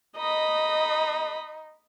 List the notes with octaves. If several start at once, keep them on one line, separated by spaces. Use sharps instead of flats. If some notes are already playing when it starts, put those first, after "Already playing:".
D#4 D#5 B5